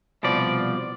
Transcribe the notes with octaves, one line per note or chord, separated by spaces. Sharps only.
C2 B2 F3 D5